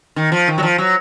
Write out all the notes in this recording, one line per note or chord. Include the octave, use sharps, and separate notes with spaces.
D#3
F3
D#3
F#3
F3
F#3